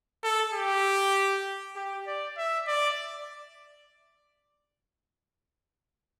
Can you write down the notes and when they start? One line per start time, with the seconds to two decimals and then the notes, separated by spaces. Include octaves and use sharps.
0.24 A4
0.54 G4
1.76 G4
2.07 D5
2.37 E5
2.67 D5